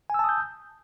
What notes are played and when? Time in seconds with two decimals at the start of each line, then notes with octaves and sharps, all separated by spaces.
0.10 G#5
0.14 E6
0.19 A5
0.24 D#6
0.29 G6